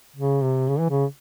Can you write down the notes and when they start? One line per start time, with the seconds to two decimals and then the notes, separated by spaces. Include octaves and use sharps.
0.16 C#3
0.43 C3
0.68 C#3
0.79 E3
0.90 C#3